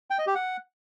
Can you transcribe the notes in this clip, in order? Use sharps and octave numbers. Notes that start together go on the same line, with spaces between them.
G5
D#5
G4
F#5